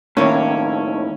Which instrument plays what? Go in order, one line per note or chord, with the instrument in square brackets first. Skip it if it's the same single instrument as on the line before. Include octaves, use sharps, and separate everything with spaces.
[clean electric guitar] D#2 A2 [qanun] D#3 A#3 [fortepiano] C#4 E4 C#5